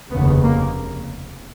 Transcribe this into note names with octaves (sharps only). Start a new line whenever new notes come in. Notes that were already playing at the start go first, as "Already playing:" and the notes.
F1 D#2 C#3 B3
A#3